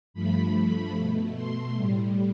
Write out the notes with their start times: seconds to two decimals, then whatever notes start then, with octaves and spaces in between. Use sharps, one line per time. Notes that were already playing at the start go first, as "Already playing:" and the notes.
0.13 G2 F3 A3 B5
0.94 B2 A3
1.34 C6
1.75 A2 G3